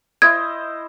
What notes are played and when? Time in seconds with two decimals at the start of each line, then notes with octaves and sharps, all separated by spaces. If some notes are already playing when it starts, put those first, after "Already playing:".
0.22 E4 C5 D#5 G#6